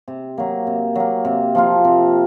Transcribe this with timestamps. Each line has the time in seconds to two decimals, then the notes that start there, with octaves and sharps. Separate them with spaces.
0.08 C3
0.38 F#3 A#3
0.67 C3
0.95 F#3 A#3
1.25 C3
1.55 F3 A#3 F4
1.85 C3